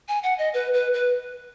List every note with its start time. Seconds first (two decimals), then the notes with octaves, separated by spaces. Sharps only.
0.08 G#5
0.23 F#5
0.38 D#5
0.54 B4
0.74 B4
0.94 B4